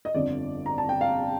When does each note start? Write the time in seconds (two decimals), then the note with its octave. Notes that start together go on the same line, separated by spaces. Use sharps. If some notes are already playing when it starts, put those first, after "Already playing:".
0.05 D#5
0.14 G1 F2 D3 D5
0.66 A#5
0.78 A5
0.89 G5
1.01 F5